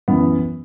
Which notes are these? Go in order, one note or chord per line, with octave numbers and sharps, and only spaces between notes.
F#2 E3 B3